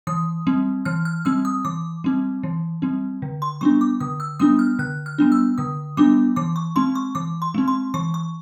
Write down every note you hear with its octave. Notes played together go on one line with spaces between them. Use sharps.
E3 D#6
G3 C4
E3 F6
F6
G3 C4 E6
D#6
E3 D6
G3 C4
E3
G3 C4
D3
C6
G3 B3 D4 C#6
D6
D3 D#6
E6
G3 B3 D4 D#6
F6
D3 F#6
F6
G3 B3 D4
E6
D3 D#6
G3 B3 D4 D6
E3 D6
C#6
G#3 C4 C6
C#6
E3 D6
C6
G#3 C4
C6
E3 C#6
C#6